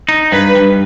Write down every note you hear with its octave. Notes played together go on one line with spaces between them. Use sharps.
D#4
G2 B4
G2